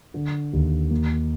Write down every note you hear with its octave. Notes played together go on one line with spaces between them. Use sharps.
D3
D#2
A#3